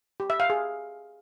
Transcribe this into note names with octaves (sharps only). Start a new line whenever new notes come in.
G4
E5
F5
G#4